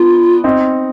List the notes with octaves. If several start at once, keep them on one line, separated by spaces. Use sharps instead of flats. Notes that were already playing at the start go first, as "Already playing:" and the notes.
Already playing: B3 D4 F4
C4 D#4